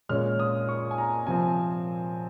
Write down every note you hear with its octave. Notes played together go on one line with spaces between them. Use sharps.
A#2 G#3 C#4 F6
D#6
C#6
G#5
A#5
C3 F3 C4 G#5